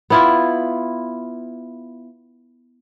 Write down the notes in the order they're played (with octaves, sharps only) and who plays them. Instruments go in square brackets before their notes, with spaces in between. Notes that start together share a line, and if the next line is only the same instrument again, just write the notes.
[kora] B3 E4 F4